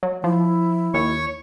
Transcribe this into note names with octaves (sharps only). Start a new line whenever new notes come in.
F#3
F3 E4
D#2 C#5 C#6